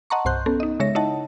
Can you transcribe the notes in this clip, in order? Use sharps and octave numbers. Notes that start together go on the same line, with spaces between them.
D#5 F#5 A5 A#5 C6 C#6
C2 G2 C5 C6 F#6 G6
B3 C#4 A4
D#4 D#5
C#3 G#3 C#5 E5 A#6
D#4 E4 C#5 D#5 F#5 A5